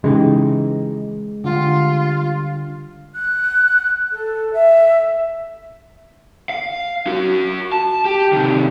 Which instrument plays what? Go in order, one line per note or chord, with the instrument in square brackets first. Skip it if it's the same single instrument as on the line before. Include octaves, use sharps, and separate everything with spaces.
[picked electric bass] C#3 [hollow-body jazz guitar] E3 D#4 G4 [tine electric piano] G#3
[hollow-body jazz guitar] D3 G3 [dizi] F4
[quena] F#6
A4
E5
[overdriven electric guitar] F5
F#4 A#4
A5
G4
C3 D#3